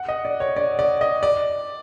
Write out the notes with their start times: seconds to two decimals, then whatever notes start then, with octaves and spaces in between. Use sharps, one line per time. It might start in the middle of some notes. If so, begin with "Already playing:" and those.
Already playing: F#5
0.08 D#5
0.25 D5
0.40 C#5
0.56 D5
0.79 D5
1.01 D#5
1.23 D5